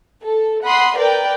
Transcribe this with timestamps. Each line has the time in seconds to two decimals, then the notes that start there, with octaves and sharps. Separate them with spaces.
0.22 A4
0.65 F#5 B5 C6 D#6
0.96 A#4 B4 D5 G5